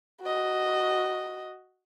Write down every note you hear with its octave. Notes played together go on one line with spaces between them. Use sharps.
F#4 D#5